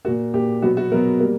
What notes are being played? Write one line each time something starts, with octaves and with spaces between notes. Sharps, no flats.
A#2 A#3 F#4
A#2 A#3 G4
B2 F#3 B3 F#4
F#4
B2 F#3 B3 A#4
G3 A#3